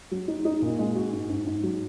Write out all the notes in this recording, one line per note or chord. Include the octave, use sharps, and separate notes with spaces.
F#3
D#4
D#4
A#2
G#3
F#4
G#2
G#2
G#2
F#3